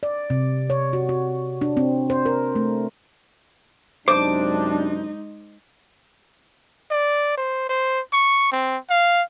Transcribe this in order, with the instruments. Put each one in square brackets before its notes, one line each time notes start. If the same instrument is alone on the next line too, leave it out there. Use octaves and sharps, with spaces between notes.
[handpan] D5
C3
C#5
F#4
F#4
D4
C4
C5
A#4
A3
[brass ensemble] F#2 C3 D4 [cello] G#3 D#4 [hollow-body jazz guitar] C5 [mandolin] D6
[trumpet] D5
C5
C5
C#6
C4
F5